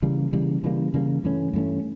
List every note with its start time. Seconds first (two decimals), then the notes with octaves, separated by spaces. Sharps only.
0.02 C#3 E3 G3 A#3
0.33 C#3 E3 G3 A#3
0.64 C#3 E3 G3 A#3
0.94 C#3 E3 G3 A#3
1.24 G2 E3 A3 C#4
1.53 G2 E3 A3 C#4